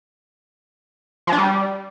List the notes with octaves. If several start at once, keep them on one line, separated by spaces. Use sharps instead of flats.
F3
D4
G3